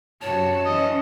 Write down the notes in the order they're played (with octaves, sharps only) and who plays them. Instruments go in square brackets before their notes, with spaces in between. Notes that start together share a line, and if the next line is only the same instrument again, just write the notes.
[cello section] F#2 C3 F#4 [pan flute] C#5 [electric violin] A5
[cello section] E3 C#4 [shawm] D#5